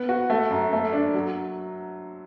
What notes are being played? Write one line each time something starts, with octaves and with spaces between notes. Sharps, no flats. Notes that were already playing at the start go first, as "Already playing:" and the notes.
Already playing: B3
F#4
A3
F#2
A3
D4
F#3